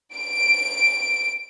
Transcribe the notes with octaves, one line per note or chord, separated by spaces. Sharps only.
D7